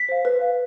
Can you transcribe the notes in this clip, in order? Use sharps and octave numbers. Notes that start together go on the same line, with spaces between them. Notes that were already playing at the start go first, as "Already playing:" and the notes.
Already playing: B6
C5 F5
B4
F5